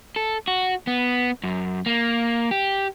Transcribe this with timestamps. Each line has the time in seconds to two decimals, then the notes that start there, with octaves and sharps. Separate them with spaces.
0.16 A4
0.48 F#4
0.87 B3
1.43 F#2
1.86 A#3
2.51 G4